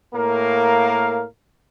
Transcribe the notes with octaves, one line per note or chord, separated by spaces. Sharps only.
A2 A#3 A#4 F5